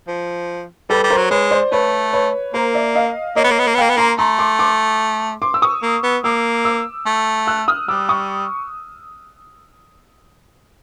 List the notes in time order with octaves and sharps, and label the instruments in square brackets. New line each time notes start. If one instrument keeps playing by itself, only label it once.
[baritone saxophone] F3
[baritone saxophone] G3 [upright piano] A4 B4
[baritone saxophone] G3
[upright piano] A#4 C5
[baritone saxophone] F#3
[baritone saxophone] G#3 [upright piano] B4 C#5
[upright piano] C5 D5
[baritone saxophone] A3 [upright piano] B4 C#5
[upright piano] B4 C#5
[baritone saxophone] A#3 [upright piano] A#4 C5
[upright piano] D5 E5
D#5 F5
[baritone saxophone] A#3 [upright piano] C#5 D#5
[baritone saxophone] B3
A#3
B3
A#3
B3
[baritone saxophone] A#3 [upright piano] F5 G5
[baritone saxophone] B3
[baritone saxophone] A#3 [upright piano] A#5 C6
[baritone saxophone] A3 [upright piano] A#5 C6
[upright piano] C6 D6
C6 D6
C6 D6
E6
C#6 D#6
[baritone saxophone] A#3
B3
[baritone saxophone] A#3 [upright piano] D6 E6
[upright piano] D6 E6
[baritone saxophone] A3
[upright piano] E6 F#6
D#6 F6
[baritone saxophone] G3 [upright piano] D6 E6
[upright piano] C#6 D#6